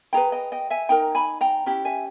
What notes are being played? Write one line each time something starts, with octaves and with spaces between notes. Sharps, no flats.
E4 G#4 B4 G5 A#5
D#5 G5
D#5 G5
E5 G#5
D#4 A#4 G5 A#5
G#5 B5
G5 A#5
C#4 E4 G4
E5 G#5